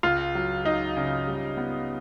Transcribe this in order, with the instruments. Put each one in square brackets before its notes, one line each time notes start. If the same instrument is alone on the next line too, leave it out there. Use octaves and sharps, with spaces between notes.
[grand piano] C#2 [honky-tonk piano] F4
[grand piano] F#3
[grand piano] F#3 [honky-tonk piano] D#4
[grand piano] C#3
G3
B3